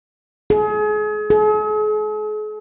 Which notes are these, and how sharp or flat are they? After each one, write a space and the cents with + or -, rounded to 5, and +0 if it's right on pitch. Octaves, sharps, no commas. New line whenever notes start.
G#4 +35
G#4 +45